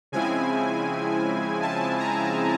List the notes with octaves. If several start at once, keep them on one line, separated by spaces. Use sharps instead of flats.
C#3 F3 G#3 C4 E4 G#5
A5
A#5